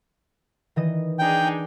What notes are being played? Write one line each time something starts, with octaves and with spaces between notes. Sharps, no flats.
D#3 E3 D#5
D4 D#4 G#4 G5